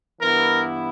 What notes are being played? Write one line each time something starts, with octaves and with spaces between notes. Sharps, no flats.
G2 E3 B3 E4 A#4